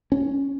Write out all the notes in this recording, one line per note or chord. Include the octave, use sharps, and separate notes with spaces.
C#4